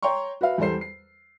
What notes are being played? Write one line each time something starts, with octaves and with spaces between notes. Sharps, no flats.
C#5 G5 A#5 C6 C#6
F#4 B4 E5 F5
E2 G3 A4 C5 C7
C7